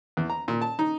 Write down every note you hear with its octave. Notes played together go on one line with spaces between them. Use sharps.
E2
A#5
A#2
A5
D#4